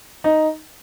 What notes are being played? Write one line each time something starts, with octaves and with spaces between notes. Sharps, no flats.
D#4